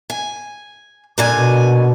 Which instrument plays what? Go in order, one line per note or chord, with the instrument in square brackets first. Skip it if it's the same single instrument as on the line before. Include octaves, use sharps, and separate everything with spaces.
[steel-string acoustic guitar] G#5
A#2 D3 G#5
[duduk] B2